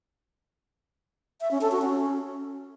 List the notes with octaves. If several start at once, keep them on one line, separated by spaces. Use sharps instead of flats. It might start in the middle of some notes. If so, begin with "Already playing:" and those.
E5
C#4
A4
F#4
C#4